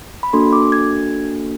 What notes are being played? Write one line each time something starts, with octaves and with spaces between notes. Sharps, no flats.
B5
A#3 D4 F#4 A4 C6
D6
G#6